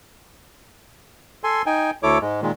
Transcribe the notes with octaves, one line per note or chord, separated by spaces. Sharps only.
A4 G#5 C6
D#4 G5 G#5
D2 E4 A4 C#5 D6
G#2 G#3
A#2 D#3 G#3